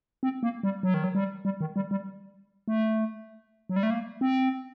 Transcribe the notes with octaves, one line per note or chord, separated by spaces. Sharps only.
C4
A#3
G3
F#3
D#3
F#3
G3
G3
D#3
G3
G3
A3
F#3
G3
A3
A#3
C4